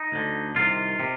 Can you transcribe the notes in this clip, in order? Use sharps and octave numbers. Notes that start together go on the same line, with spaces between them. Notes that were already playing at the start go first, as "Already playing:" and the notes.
Already playing: D#4
D2 D3
C2 C3 D#3 F4
C3